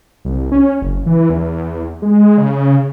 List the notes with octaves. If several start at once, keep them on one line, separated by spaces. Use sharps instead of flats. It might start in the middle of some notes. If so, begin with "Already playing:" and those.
C2
C#4
F#1
E3
E2
G#3
C#3